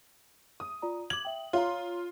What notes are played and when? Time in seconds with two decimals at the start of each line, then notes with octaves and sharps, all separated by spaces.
0.60 D#6
0.82 F4 D5 A#5
1.10 D6 G#6 F#7
1.25 E5 G5
1.53 F4 C#5 F5 A#5